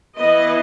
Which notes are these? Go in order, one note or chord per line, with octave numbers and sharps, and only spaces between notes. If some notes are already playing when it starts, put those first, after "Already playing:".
E3 B3 B4 D#5